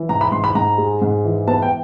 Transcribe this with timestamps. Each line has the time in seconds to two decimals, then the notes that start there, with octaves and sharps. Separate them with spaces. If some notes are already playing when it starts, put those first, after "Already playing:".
Already playing: E3
0.09 G#2 A#5
0.21 B5
0.32 G#2 C6
0.44 B5
0.55 G#2 A#5
0.78 G#3
1.02 G#2
1.25 E3
1.47 B3 A5
1.62 G5